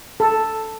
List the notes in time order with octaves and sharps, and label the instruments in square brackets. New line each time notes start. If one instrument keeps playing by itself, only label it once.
[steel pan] A4